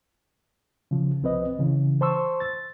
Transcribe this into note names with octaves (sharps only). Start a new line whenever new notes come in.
C#3 F3
C2 F3 C4 B4 D#5
C#3 E3
C5 A5 C6 C#6 E6
A6